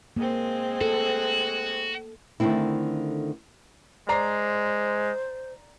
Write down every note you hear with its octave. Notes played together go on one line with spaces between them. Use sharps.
G#3 A#3 C4
F#4 A4
D3 D#3 A3 C4 E4
G#3 C5 D5 A#5 C7